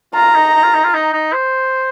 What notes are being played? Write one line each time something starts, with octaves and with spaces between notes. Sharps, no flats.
F4 A#5
D#4
D#4
F4
D#4
F4
D#4
D#4
C5